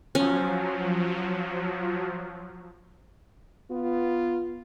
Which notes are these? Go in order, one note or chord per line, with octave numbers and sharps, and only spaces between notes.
F3 F#3 C#4
B3 F4